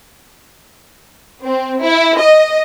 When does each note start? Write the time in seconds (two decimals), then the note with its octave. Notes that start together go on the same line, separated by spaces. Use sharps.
1.44 C4
1.83 E4
2.19 D#5